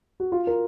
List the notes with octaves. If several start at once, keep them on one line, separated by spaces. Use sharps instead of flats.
F#4
F4
A#4